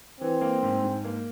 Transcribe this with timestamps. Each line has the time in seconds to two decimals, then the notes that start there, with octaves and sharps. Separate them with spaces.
0.21 E3 C4
0.41 A#3
0.63 G#2
0.84 G#2
1.04 A#3